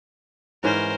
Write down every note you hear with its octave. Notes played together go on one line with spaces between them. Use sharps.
G#2 E3 C#4 A#4 C5